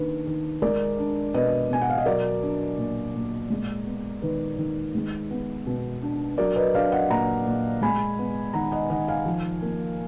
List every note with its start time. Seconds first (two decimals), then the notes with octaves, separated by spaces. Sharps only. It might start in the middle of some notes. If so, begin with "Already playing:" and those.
Already playing: D#3 A#3 D4 B4
0.27 D#3
0.62 G#3 A#4 D5
0.98 D4
1.34 B2 B4 D#5
1.71 B2 G#5
1.82 F#5
1.90 F5
1.98 D#5
2.06 F#3 A#4 D5
2.42 D4
2.78 A#2
3.14 A#2
3.50 G#3
3.86 B3
4.22 D#3 B4
4.58 D#3
4.95 G#3
5.31 B3
5.66 B2
6.02 D4
6.38 F#3 A#4 D5
6.56 B4 D#5
6.74 D4 D5 F5
6.92 D#5 F#5
7.10 A#2 F#5 A#5
7.46 A#2
7.82 G#3 G#5 B5
8.19 B3
8.54 D#3 F#5 A#5
8.72 D#5 F#5
8.90 D#3 D#5 F#5
9.08 F5 G#5
9.26 F3
9.62 A#3